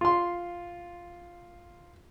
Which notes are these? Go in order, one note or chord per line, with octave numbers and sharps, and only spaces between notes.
F4 C6